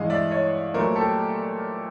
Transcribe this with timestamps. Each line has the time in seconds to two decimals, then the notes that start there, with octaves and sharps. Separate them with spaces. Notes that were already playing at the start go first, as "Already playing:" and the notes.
Already playing: G2 E3 G#3 D#5 F5
0.10 D5 E5
0.31 C#5 D#5
0.74 A#2 F#3 A3 A#4 C5
0.96 G4 A4